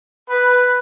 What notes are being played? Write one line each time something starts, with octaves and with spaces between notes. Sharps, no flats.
B4